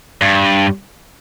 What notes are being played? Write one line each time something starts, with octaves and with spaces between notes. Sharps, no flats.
G2